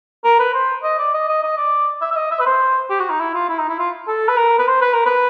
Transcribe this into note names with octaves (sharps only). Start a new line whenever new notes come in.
A#4
B4
C5
D#5
D5
D#5
D#5
D#5
D5
E5
E5
D#5
E5
B4
C5
G4
F#4
D#4
E4
F4
E4
D#4
E4
F4
A4
B4
A#4
B4
C5
B4
A#4
B4